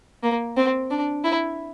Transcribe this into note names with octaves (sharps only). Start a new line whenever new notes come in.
A#3
C4
D4
E4